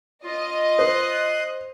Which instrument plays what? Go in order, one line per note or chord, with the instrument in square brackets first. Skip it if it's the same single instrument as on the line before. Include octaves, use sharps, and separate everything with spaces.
[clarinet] F4 [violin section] D#5
[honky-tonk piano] C5 [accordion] C6 D#6 F#6